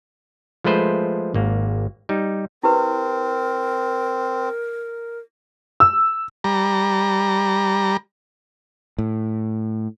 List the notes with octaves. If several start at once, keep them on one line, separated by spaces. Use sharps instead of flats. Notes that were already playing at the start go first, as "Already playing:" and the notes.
F3 G#3 A3 B4 C5
G#1 A#3
G3 D#4
C4 E4 G4 A#4 B4
E6
G3 A#5
A2